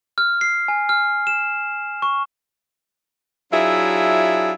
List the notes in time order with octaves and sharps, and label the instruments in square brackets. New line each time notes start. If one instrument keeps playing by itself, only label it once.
[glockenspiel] F6
C7
G#5
F6
E7
C#6
[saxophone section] F#3 D4 E4 F4 G#4 E5